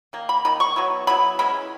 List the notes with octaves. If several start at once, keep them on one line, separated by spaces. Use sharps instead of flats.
D#3 A#3
B5
D#3 A#3 D#4 B5
C#6
F#3 B3 E4
F#3 B3 E4 B5
E3 G#3 C#4 E4 B5